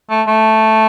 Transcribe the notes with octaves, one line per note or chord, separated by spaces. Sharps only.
A3
A3